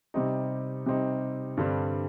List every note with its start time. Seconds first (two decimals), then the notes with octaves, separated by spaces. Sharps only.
0.14 C3 G3 C4 D#4
0.86 C3 G3 C4 D#4
1.57 G2 D3 G3 C4